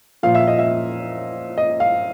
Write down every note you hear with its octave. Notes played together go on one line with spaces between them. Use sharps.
A#2 F3 F5
E5
D#5
E5
D#5
F5